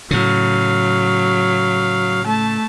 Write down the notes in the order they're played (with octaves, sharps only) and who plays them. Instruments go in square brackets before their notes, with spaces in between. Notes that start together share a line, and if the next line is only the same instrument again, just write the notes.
[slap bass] A2 C#3 [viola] F#3 F5
[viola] A3 A5